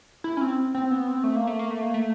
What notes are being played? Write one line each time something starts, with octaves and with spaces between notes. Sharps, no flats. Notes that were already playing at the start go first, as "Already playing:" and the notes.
E4
C#4
C4
C4
B3
C4
A3
A#3
A3
A#3
A3
A#3
A3